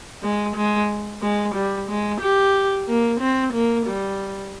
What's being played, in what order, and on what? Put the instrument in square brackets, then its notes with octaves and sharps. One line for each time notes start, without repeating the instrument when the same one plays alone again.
[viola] G#3
G#3
G#3
G3
G#3
G4
A#3
C4
A#3
G3